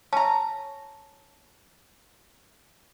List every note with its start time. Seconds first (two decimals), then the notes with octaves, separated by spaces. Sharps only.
0.13 C#4 A5 A#5